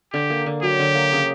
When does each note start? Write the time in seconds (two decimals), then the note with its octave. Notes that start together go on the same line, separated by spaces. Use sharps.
0.13 D3 G4
0.30 A#3
0.46 D3
0.63 F#3 G4
0.79 D3
0.95 A#3
1.12 C#3